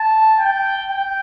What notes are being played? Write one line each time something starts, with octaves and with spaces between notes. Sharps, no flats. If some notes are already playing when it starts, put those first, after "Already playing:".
Already playing: A5
G5
G5